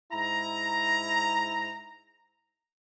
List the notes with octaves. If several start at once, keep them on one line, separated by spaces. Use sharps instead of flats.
G#2 E4 A#5